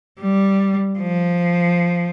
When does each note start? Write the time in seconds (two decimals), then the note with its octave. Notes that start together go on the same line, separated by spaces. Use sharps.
0.21 G3
0.99 F3